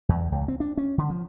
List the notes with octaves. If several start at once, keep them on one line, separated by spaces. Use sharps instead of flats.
E2
C#2
C4
D4
C#4
D3
F3